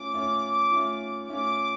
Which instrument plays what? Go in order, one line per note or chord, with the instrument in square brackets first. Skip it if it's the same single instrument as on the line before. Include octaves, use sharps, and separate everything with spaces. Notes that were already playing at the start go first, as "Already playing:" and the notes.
Already playing: [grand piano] A3 C#4 F4 [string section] D6
[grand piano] A3 C#4 F4
A3 C#4 F4
[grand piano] A3 C#4 F4 [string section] D6